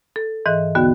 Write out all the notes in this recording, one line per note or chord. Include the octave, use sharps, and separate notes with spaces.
A4
G#2 E3 D#5 F#6
D#2 D3 B3 F#4 F#6